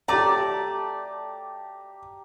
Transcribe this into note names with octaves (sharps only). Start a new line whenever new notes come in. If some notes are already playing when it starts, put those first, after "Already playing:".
A3 G4 D5 A#5 D6